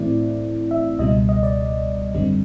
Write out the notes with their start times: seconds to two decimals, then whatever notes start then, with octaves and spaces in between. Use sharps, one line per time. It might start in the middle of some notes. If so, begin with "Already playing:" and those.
Already playing: A2 E3 A3 C4 E4 D5
0.71 E5
0.99 C#2 B2 G3 D#5
1.29 D#5
1.43 D5
2.15 G#1 F#2 D3 G3 C4